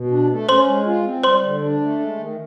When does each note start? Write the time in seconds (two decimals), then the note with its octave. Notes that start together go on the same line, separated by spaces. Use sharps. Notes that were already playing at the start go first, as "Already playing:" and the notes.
Already playing: B2
0.11 D4
0.29 A3
0.48 C#4 C5 C6
0.67 G#3
0.86 F4
1.05 C4
1.24 G3 C5 C6
1.43 D3
1.62 D4
1.81 A3
1.99 G#3
2.18 D#3